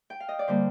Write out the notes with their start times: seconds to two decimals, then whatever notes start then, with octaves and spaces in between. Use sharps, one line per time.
0.10 G5
0.20 F5
0.29 D#5
0.39 D5
0.47 D3 G3 A#3 C5